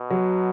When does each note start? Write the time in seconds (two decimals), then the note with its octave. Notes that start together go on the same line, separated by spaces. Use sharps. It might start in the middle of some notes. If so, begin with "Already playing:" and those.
Already playing: B2
0.10 F#3